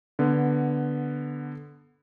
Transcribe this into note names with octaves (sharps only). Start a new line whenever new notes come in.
D3 B3